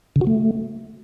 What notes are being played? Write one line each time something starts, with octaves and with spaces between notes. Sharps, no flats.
C#3
F#4
A3